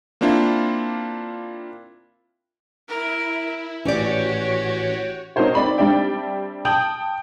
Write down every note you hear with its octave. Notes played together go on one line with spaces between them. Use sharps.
A#3 C4 D4 E4 F4
E4 A#4
G#1 A2 E3 C#4 F#4 G4 C#5 D5
C4 D#4 F#4 A#4 C5 C#5
C4 D5 B5
G3 C4 D4 D5 E5 G5
G5 A5 D#6 G6 F#7